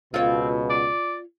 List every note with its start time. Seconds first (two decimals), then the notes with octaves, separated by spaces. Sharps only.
0.14 C#2 B2 C4 F4 C#5
0.70 D5